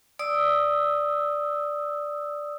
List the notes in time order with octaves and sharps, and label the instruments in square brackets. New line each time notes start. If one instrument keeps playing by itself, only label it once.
[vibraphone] D5 D#6 E6